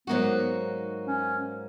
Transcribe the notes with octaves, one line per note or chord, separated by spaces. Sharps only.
G#2 F#3 A#3 B3 D#4 F#4
C#4